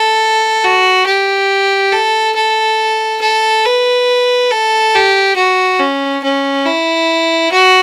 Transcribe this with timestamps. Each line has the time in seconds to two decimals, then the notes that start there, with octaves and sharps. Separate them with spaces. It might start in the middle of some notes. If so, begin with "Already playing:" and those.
Already playing: A4
0.64 F#4
1.06 G4
1.92 A4
2.35 A4
3.21 A4
3.65 B4
4.51 A4
4.94 G4
5.36 F#4
5.79 C#4
6.23 C#4
6.66 E4
7.52 F#4